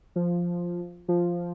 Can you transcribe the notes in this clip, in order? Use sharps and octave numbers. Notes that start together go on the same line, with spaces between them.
F3
F3